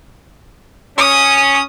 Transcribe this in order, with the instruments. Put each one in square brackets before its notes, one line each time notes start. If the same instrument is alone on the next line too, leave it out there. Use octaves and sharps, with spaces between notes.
[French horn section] C#4 [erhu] D#6